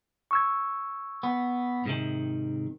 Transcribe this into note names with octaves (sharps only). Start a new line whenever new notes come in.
C#6 E6 G#6
B3
G#2 C3 D#3